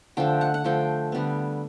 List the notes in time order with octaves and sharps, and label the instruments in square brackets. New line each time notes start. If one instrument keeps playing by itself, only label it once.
[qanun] D3 F3 A3 G5
F#5
F#5
D3 F3 A3 G5
D3 G3 B3